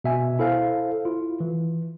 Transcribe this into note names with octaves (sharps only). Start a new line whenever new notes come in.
B2 E5 G#5
E4 A4 C5 F5
E4 F4
E3